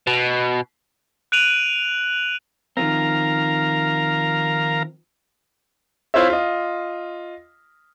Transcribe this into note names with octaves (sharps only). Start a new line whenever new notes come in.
B2
F#6 D7 D#7 F7 F#7
D#3 F3 C4 A#4 F5 A#5
C4 E4 F4 C5 C#5 E5
F4 D#5